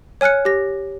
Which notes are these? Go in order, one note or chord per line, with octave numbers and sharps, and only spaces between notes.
C#5 G#5 F6 F#6 C#7
G4 A#6